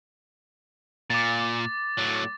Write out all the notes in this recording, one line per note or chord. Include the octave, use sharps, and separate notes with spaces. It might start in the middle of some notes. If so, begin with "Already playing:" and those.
A#2 D6 A6
A2 F#3